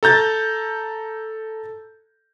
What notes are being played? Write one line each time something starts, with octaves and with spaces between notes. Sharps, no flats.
A4 A#5 G6 A6